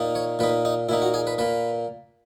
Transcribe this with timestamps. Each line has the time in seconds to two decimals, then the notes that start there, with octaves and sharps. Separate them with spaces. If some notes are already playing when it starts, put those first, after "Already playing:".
Already playing: A#2 A#3 D#4
0.15 C#5
0.39 A#2 A#3 D#4 B4
0.65 D#4
0.89 A#2 A#3 D#4 E4
1.02 F#4
1.14 G#4
1.27 B4
1.38 A#2 A#3 B4